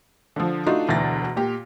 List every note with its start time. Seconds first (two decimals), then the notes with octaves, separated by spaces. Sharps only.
0.36 D3 F3
0.66 A3 D4 D#4 F4 F#4
0.88 E1 D2 E3 D4 A6 A#6
1.36 A#2 G4